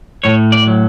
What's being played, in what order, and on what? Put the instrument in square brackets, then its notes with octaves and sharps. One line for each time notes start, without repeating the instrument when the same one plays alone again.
[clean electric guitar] A2 C#5
D5
F#3